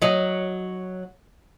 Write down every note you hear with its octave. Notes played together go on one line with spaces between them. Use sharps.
F#3 D#4